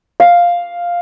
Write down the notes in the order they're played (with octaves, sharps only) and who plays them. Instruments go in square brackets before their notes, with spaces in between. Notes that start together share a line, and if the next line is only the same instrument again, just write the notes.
[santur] F5